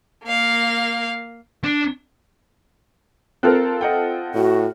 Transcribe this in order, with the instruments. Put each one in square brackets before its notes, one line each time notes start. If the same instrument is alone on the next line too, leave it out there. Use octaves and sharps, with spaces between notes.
[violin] A#3 F5
[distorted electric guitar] D4
[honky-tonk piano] C4 F4 A4 [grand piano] A#4 F6 F#6
[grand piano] D#5 F#5 G5
[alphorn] A2 [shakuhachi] F#4